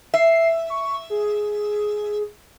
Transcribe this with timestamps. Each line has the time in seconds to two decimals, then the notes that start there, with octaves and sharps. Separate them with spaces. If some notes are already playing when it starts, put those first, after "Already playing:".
0.14 E5 C7
0.70 C#6
1.10 G#4